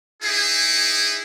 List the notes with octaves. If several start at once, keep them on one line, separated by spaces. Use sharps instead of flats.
D#4 E4 G#4